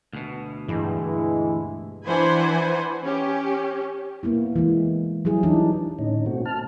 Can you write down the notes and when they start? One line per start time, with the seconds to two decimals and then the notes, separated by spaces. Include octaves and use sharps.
0.13 D2 B2
0.68 G2 E3 G#3 E4
2.06 E3 D4 C5 F#5 G#5 B5
3.02 C#4 G4
4.23 A#3 B3 E4
4.56 E3 G#3
5.25 F#3 G3 E4 G#4
5.43 E3 D4 D#4
5.99 A2 D3 C#4 D#4
6.26 B2 A3 C4 F#4
6.46 A5 F6